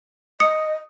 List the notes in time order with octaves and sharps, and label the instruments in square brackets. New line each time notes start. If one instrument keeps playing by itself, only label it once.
[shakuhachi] D#5 [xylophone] D#6 C#7